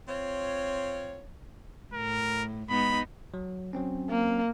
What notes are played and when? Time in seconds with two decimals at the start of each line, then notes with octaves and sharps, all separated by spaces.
0.08 C4 F4 C#5
1.93 A2 A#4
2.69 G#2 B3 D#4 B5
3.34 F#3
3.73 F#3 C4 C#4
4.10 A#3